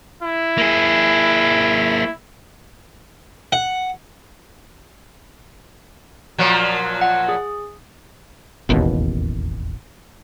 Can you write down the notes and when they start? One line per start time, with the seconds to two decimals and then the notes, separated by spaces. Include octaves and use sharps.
0.23 E4
0.58 A#3 G#4
3.52 F#5
6.38 A#2 F3 F#3
7.01 F#5
7.29 G#4
8.69 E1 A1 D#2 B2